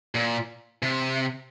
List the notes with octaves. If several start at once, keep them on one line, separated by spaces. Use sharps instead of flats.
A#2
C3